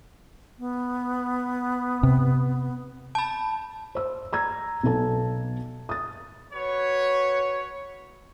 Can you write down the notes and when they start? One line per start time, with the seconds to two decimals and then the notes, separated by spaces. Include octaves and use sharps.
0.59 B3
2.03 C3
3.15 A5 B5
3.95 C5 E6
4.33 A#5 E6 G#6
4.83 B1 B2 A4 A5
5.89 D#6 A6
6.53 F#4 B4 C#5